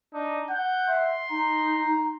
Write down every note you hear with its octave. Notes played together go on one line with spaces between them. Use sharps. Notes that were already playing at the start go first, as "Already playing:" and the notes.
D4 D#4
F#5 G6
E5 C6
D#4 A#5